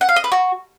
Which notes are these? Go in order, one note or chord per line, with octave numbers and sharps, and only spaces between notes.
F#5
F5
D#5
B4
F#4